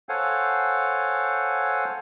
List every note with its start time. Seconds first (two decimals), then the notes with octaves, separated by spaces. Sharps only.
0.09 A4 C5 C#5 F5 F#5 G#5